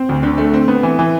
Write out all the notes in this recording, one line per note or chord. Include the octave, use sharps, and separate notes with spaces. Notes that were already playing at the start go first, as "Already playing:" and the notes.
Already playing: C4
D2
D3
A3
C4
B3
E3
E3